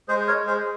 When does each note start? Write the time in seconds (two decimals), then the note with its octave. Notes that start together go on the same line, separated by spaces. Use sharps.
0.08 G#3 G#4 C5
0.28 A#4 C#5
0.34 G#3
0.47 G#4 C5
0.60 G#4